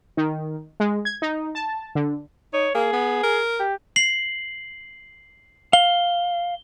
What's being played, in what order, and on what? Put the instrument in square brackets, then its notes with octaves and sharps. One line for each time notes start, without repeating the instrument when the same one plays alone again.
[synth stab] D#3
G#3
G#6
D#4
A5
D3
[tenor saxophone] D#4 [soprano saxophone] C#5
[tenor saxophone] A#3 [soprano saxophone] G#4
[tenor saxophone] B3
A#4
[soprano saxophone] G4
[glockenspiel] C7 F#7
[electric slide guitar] F5 [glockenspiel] G7